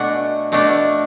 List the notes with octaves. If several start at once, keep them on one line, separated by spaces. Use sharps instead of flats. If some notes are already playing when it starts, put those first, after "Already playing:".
Already playing: B2 A3 D4 F#5 G#5
B2 A3 D4